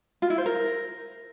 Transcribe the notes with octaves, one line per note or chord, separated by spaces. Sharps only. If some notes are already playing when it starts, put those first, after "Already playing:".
F4
E4
C5
A#4